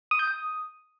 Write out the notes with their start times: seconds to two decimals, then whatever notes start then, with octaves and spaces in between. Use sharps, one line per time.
0.11 D#6
0.19 G6
0.27 D#6